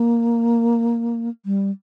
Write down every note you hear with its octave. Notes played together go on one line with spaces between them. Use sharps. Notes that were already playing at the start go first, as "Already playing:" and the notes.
Already playing: A#3
G3